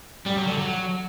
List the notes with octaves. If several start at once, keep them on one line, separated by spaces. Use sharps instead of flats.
G3
F#3
D3
F#3